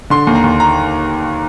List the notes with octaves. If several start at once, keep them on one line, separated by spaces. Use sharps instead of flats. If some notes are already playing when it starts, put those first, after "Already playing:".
D3 C6
D#2
A#5
D#2
A#5